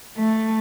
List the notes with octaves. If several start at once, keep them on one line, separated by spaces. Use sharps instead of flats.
A3